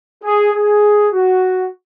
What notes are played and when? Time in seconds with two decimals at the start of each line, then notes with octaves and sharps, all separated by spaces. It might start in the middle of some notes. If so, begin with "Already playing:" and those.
0.23 G#4
0.54 G#4
1.13 F#4